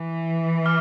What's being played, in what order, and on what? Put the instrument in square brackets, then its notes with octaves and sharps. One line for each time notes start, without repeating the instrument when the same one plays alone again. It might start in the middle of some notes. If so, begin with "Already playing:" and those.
Already playing: [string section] E3
[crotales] D6 F6